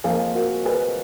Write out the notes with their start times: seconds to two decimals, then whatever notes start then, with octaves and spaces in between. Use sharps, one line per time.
0.04 F2 F3 A#3 F4 G#4
0.35 F#4 A#4
0.65 G#4 B4